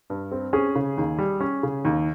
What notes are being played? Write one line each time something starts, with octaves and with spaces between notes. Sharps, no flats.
G2
C4
C#4 G#4
C#3
D#2
G3
C#4
C#3
D#2